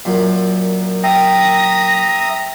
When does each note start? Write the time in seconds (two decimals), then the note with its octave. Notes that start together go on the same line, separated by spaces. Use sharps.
0.05 F#2 A#2
1.04 E5 G5 A#5 D#6 A#6